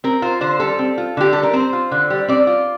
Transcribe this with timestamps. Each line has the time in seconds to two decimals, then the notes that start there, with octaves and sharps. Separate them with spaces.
0.04 C4 A#4
0.22 F4 C5
0.41 D3 C5
0.60 G3 A4
0.79 C4
0.98 F4
1.17 D3 G4
1.33 G3 A4
1.43 A#4
1.53 C4 C5
1.73 F4
1.91 D3
2.10 G3
2.28 C4 D5
2.47 F4